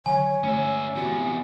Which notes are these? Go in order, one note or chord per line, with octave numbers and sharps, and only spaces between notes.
D3 D#3 F#3 C#5 G#5
G2 D3 A3 C#4 E5
E2 C3 F#4